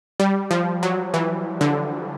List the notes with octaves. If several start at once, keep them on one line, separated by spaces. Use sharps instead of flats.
G3
F3
F#3
E3
D3